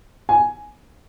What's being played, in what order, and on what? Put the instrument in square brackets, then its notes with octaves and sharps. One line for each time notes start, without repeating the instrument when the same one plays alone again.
[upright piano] G#5